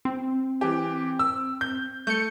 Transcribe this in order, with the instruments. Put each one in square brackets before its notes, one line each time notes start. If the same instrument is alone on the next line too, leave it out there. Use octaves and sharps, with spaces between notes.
[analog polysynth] C4
[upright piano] E3 G4
E6
G6
[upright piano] A3 [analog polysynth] G6 C#7